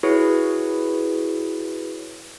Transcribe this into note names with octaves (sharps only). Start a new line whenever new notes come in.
E4 F#4 G#4 B4 C#5